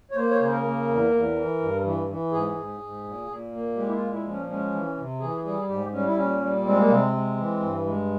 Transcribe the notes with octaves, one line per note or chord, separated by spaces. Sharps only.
C#5
A#3 C5
C#5
C#3 C5
A#4
A#3
E2
E2
E3
G2
E3
E3
G#2 G#4
G#2
G#2
A#2
A#2
A#3
G#3 G4
E4
F4
A#2
E4
F3
C#4
G#3 C#4
E3
C3
E3 G#4
G3 G#4
G#2 G4
G3 C#4
E4
A#2 C#4
G3
G#3 C4
A#3
C3 C4
G#3
E3
G2
G#3